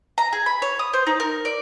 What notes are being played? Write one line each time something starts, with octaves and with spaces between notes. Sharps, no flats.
A#5
G#4
B5
C#5
D#6
C5
D#4
A#4
D5